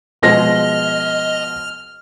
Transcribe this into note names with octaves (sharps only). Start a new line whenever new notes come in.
B2 F3 G#3 D#5 F6 A#6